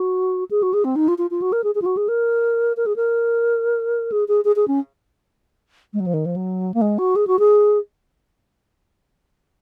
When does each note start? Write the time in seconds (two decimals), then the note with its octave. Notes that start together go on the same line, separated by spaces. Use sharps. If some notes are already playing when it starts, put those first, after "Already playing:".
Already playing: F#4
0.51 G#4
0.63 F#4
0.74 G#4
0.84 C4
0.96 D#4
1.08 F4
1.18 F4
1.31 F4
1.42 F#4
1.52 A#4
1.64 G#4
1.75 G#4
1.82 F4
1.86 F#4
1.97 G#4
2.08 A#4
2.77 A#4
2.86 G#4
2.96 A#4
4.12 G#4
4.28 G#4
4.45 G#4
4.56 G#4
4.68 C#4
5.93 G#3
6.00 F#3
6.06 F3
6.14 D#3
6.26 F3
6.36 F#3
6.74 A#3
6.81 G#3
6.98 F#4
7.16 G#4
7.27 F#4
7.39 G#4